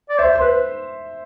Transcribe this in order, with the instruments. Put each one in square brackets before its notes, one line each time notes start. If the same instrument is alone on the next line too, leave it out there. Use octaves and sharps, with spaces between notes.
[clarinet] D5
[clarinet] C5 [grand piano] E5
[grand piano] C5
[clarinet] B4